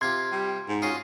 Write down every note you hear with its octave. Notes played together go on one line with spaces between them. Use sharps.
C3 F4 G4 C6 G#6
G3
G#2
C#4 F4 F#4 C6 D#6